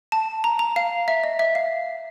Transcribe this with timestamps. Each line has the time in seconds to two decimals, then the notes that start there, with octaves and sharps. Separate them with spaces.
0.12 A5
0.44 A#5
0.59 A#5
0.76 F5
1.08 E5
1.24 D#5
1.39 E5
1.55 F5